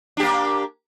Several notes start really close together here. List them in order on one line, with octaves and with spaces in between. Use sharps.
D4 G4 A#3